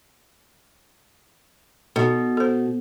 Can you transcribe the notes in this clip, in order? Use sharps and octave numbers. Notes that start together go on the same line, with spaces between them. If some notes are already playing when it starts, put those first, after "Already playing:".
B2 D#4 F#4 A4
A4 C5